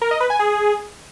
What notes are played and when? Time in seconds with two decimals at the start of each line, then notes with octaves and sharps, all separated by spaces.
0.02 A#4
0.11 D#5
0.20 B4
0.30 G#5
0.39 G#4